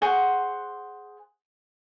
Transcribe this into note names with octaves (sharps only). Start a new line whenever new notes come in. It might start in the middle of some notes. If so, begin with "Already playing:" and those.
G#4 C5 F#5 C#6